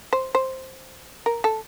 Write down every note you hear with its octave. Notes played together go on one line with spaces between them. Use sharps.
C5
C5
A#4
A4